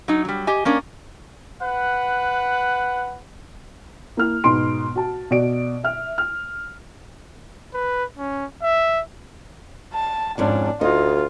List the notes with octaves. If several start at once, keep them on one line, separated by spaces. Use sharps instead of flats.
F#3 D#4
F#3 G3
G4 D#5 G#5
A#3 C#4 D4 A#4
B4 F#5
A#3 E4 F6
G#2 B2 B3 C6 D7
F#4 A5
B2 F#4 D5 D7
E5 F6
F6
B4
C#4
E5
A5
F2 G#2 C#4 D4
D2 D#4 F4 D#5